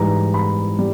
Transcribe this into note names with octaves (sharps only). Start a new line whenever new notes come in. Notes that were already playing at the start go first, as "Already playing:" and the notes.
Already playing: G#2 E3 G3 A#5
B5
G3